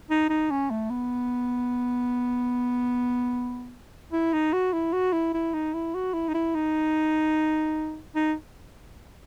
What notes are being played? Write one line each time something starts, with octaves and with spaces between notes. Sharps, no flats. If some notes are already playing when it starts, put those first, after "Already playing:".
D#4
D#4
C#4
A3
B3
E4
D#4
F#4
E4
F#4
E4
E4
D#4
E4
F#4
E4
D#4
E4
D#4
D#4